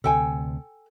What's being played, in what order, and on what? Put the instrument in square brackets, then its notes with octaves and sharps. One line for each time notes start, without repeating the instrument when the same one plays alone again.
[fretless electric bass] D2 C3 [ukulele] A4 G5 G#5